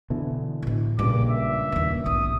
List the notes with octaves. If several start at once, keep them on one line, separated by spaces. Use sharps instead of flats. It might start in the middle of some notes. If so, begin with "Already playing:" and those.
B2 D3 E3
A1 G#3
A#1 G2 A#2 C#3 G#3 D6
E5
D#2 A#3
B1 G#2 D#6